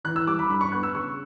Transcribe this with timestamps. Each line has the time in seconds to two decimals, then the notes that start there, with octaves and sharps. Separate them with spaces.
0.04 E3 F#6
0.16 E6
0.27 G3 D6
0.39 B5
0.50 G2 B5
0.61 C#6
0.72 B3 F#6
0.83 E6
0.94 C#3 C#6